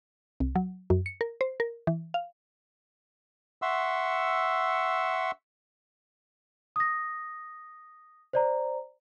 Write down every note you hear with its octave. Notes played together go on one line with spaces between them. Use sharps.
C2
F#3
F#2
C#7
A#4
C5
A#4
E3
F5
E5 F#5 C6 C#6 E6
D#6 A#6
C5 D5 A#5